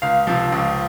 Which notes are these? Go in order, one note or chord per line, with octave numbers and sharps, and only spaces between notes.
C#2 F5
C3 F3
C#2